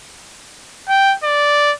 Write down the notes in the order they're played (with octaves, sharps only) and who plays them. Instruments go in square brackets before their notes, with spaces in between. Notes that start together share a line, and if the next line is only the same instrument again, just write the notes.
[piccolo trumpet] G5
D5